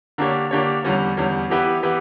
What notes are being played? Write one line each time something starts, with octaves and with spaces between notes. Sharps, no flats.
D3 A#3 D4 G4 C#5
D3 A#3 D4 G4 C#5
E2 D3 G3 C#4
E2 D3 G3 C#4
E3 B3 E4 G4 B4
E3 B3 E4 G4 B4